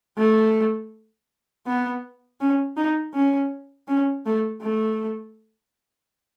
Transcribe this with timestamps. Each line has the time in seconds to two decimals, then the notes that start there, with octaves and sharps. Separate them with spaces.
0.18 A3
1.67 B3
2.40 C#4
2.77 D#4
3.14 C#4
3.88 C#4
4.26 A3
4.62 A3